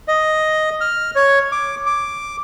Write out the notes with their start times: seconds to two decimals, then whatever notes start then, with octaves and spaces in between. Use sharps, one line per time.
0.08 D#5
0.81 F6
1.16 C#5
1.52 D6
1.86 D6